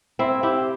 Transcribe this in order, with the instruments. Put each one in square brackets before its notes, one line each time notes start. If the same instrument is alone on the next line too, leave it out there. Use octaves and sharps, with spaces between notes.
[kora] C4 E4
E4 G4